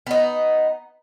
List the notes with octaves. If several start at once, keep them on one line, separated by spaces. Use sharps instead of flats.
B3 D#4